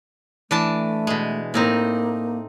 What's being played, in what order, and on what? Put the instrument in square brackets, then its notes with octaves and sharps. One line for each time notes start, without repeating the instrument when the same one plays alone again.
[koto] E3 D4 A5 [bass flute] A3
[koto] B2 G#3
[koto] A2 C4 D#4 [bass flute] A#3